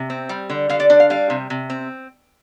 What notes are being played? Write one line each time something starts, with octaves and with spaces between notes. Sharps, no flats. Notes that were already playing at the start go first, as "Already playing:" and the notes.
Already playing: C3
C4
G3
D3
D3 F5
D5
D4 D5
F5
G3 F5
C3
C3
C4